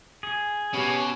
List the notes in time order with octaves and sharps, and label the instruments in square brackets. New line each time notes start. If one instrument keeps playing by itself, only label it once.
[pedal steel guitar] G#4
[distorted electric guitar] B2 [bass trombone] C#4 [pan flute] G4